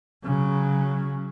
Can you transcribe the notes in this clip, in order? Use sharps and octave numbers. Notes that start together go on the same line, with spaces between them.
C#3 F#3